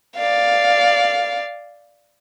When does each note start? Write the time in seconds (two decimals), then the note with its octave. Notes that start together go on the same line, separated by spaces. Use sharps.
0.17 D5 F5